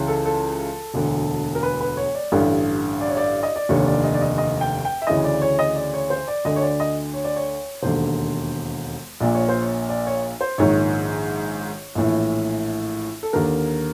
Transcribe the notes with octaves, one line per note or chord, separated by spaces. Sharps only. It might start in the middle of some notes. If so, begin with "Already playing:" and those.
Already playing: C#2 C#3 E3
A4
A4
E1 D2 D3
A#4
B4
B4
C#5
D5
A1 G2 D3
D5
C#5
D5
D#5
D5
F1 D#2 D3 C#5
D5
D#5
D5
D#5
D#5
G5
G5
E5
D2 C#3 E3 D#5
D5
C#5
D#5
D5
C#5
C5
D5
D2 D3 D#5
C#5
D5
D#5
C#5
D5
C#5
E1 D#2 D3 C5
A#1 A#2 D5
C#5
C5
C#5
D5
C#5
C5
A#1 G#2 D#3 C#5
A#1 A2 E3
A4
D#2 D3 A#4